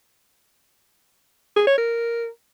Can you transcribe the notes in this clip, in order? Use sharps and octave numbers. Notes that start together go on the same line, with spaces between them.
G#4
C#5
A#4